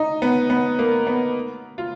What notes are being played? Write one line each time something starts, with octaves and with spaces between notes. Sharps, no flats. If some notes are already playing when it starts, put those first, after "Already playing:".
Already playing: D#4
B3
B3
A#3
B3
F4